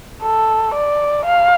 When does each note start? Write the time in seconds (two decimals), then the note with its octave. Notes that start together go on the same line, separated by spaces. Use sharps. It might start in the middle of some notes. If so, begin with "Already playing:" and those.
0.23 A4
0.74 D5
1.25 F5